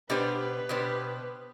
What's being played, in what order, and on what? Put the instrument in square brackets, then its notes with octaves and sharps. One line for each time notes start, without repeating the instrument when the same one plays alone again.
[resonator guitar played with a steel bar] B2 B3 D4 G4 C5 [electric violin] B4
[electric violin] B4
[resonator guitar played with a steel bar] B2 B3 D4 G4 C5